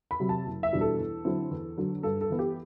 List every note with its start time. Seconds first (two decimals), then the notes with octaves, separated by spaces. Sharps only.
0.11 B5
0.20 C3 F#3
0.29 A5
0.46 F#1
0.63 E5
0.73 E2 B2 G3 D4
0.81 A4
0.99 E2
1.25 D3 F#3 C4 E4
1.51 E2
1.78 D3 F#3
2.03 G2 A4
2.21 A4
2.30 E3 B3
2.39 G4